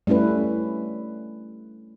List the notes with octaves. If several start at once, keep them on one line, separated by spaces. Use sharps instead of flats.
G3 A3 C#4 E4 B4